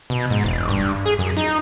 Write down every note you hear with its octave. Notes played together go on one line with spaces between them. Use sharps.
B2
G#2
E1
G2
G#4
F#2
D#4